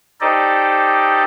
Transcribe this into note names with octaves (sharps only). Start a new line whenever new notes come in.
D#4 G4 A4 C5 D5 D#5